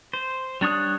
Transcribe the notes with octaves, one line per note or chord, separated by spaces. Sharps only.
C5
G3 D4 C#5 D#6 F#6